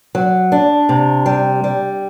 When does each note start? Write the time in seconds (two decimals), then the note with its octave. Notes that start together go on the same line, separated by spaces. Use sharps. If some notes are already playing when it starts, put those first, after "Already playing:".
0.15 F#3
0.52 D4
0.89 C3
1.26 G3
1.64 G3